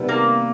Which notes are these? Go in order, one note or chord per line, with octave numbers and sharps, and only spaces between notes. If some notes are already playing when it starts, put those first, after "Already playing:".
Already playing: C3 D#3 G3 B3
A#3